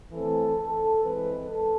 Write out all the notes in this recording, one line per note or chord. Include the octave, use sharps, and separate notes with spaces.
E3 A3 C4 A4
A4
E3 G#3 C4 B4
A4